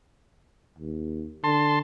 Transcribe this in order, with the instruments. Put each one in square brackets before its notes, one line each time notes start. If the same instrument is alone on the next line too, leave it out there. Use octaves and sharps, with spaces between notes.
[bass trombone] D#2
[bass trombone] D3 [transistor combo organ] A5 C6